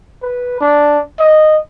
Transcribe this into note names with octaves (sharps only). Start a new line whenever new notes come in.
B4
D4
D#5